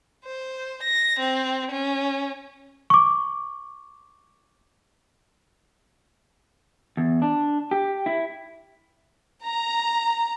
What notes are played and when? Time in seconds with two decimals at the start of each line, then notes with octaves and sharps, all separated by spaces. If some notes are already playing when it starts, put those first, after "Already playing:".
0.24 C5
0.83 A#6
1.19 C4
1.71 C#4
2.90 C#6 D6
6.97 E2
7.22 D4
7.71 G4
8.06 E4
9.46 A#5